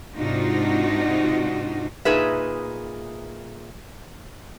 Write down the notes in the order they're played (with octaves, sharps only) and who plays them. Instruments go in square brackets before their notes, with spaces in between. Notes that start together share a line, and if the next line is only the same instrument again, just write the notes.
[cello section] G#2 C3 D4 D#4 F4 F#4
[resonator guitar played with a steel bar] A#2 D#4 G#4 B4 E5